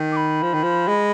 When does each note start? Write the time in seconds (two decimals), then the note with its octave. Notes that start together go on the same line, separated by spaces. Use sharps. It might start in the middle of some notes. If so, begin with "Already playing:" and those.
Already playing: D#3
0.12 D6
0.16 B5
0.43 F3
0.54 D#3
0.63 F3
0.88 G#3